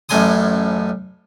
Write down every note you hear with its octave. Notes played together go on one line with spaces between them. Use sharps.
A1 F#2 A2 G#5 C6 D#6